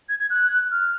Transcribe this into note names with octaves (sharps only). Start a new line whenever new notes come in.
G#6
G#6
F#6
F6